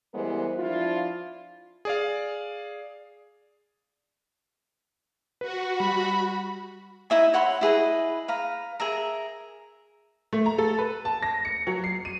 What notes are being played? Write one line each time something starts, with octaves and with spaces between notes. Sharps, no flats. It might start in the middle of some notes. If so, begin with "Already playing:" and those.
E3 G3 G#3 B3 A#4 C5
F3 D4 E4 F4
G#4 D5 F5
F#4 B4
G3 B5
D#4 E4 E5 G#5
C#5 F#5 B5 C6
E4 G#4 B4 D#5
B4 F5 A#5
G#4 A#4 E5 A#5
A3
A#5
A4
B4
A5
A#6
C#7
F#3
C7
D#7